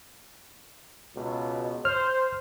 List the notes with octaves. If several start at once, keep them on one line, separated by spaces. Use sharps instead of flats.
C#2 B2
C5 F6